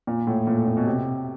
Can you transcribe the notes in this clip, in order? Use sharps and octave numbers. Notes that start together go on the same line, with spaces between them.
A#2
A2
A#2
A2
A#2
B2
C3